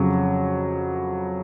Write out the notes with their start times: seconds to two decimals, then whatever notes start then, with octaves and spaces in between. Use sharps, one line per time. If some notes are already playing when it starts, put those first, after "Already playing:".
Already playing: F2 C#3 F#3